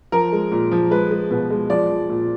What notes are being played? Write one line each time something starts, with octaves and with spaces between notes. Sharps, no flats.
F3 A#4
G#3
A#2
F3
G#3 B4
G#3
B2 B4
G#3
F3 D5
F3
A#2